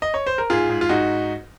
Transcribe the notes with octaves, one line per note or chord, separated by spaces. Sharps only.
D#5
C#5
C5
A#4
G#2 F4 G#4
G#2
F4
G#2 D#4 F#4